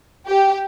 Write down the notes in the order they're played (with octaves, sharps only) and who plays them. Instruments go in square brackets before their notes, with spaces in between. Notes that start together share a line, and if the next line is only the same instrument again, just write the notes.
[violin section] G4